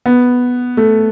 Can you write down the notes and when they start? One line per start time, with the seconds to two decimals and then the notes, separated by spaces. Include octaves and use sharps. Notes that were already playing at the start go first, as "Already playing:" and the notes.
0.06 B3
0.77 A3